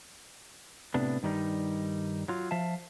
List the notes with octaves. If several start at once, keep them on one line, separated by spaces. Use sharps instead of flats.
A2 C3 B3 D4
G2 D#3 G3 D#4
F#3 F4
F3 E5 F5 A5